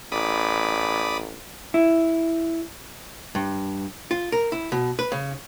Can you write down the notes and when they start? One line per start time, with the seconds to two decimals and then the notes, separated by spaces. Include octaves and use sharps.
0.12 A1 D5 B5 D#6
1.74 E4
3.35 G2
4.11 F4
4.32 A#4
4.52 E4
4.72 B2
4.99 B4
5.12 C#3